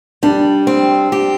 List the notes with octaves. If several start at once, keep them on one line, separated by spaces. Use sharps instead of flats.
G3 D4
C4
G4